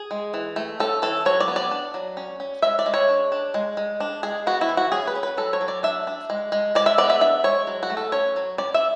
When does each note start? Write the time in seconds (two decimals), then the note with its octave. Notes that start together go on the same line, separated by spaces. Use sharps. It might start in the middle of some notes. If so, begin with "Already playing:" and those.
Already playing: G#4
0.11 G#3
0.34 E3
0.56 A3
0.80 C#4 A4
1.02 E3 A4
1.25 F#3 C#5
1.40 D5
1.48 B3
1.56 D5
1.71 D4
1.94 F#3
2.17 C#4
2.40 C#4
2.62 G#3 E5
2.79 D5
2.86 G#3
2.94 C#5
3.09 D4
3.32 D4
3.54 G#3
3.77 G#3
4.00 D4
4.23 G#3 G#4
4.47 B3 F#4
4.61 E4
4.69 E3
4.77 F#4
4.92 C#4 G#4
5.07 B4
5.15 C#4
5.23 B4
5.37 F#3 A4
5.53 C#5
5.61 F#3
5.68 D5
5.83 D4 E5
6.07 D4
6.30 G#3
6.52 G#3
6.75 G#3 D5
6.86 E5
6.98 B3 D5
7.10 E5
7.21 D4 E5
7.44 G#3 C#5
7.67 F#3
7.83 F#4
7.90 A3
7.97 A4
8.12 C#4 C#5
8.36 F#3
8.58 C#4 D5
8.74 E5